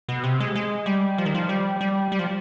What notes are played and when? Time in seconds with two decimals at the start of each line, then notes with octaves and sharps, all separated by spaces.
0.09 B2
0.24 C3
0.40 G#3
0.55 G#3
0.86 G3
1.18 F3
1.26 D#3
1.35 F3
1.49 G3
1.81 G3
2.12 G3
2.19 F3